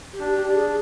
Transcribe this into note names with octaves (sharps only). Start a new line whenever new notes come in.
G4
D4
G4
D4
G#4